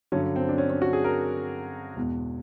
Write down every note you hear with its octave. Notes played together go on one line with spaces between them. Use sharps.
G2 D3 F#3 C#4
C4
D4
C#4
C#4
F#4
G#4
A#4
E2 B2 G#3